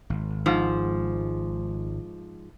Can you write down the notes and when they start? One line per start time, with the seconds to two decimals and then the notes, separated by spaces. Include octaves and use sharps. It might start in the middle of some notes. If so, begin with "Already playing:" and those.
0.10 G#1
0.46 G#2 F3